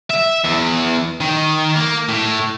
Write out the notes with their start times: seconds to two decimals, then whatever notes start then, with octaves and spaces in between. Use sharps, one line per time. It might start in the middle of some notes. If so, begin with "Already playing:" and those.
0.10 E5
0.44 E2
1.20 D#3
1.75 A#3
2.08 A2